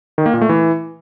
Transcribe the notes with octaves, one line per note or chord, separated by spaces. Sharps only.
D#3
A#3
A#2
A3
E3